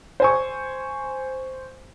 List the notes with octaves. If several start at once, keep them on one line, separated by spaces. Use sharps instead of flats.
C5 G#5 C#6